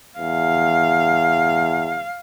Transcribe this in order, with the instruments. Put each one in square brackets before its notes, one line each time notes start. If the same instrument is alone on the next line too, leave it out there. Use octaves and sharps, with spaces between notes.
[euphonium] E2 [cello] F5